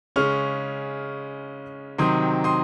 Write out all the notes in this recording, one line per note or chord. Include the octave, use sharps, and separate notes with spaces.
C#3 G#3 C#4 C#6 F6
C3 D#3 F#3 C4 C6 D#6
C6 D#6